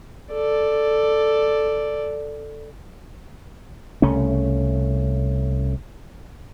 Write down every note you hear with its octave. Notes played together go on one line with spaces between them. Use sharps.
A4 D5
C2 C#3 A3 C#4